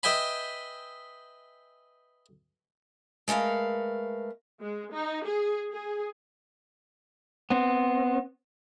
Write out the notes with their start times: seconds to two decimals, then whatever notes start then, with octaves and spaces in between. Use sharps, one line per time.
0.03 B4 D#5 E5 G5 G#5 B5
3.28 G#3 A3 A#4 B4 F5
4.60 G#3
4.92 D#4
5.24 G#4
5.72 G#4
7.50 B3 C4